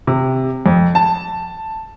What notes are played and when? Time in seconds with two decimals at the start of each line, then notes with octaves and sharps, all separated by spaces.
0.07 C3
0.66 F2
0.95 A5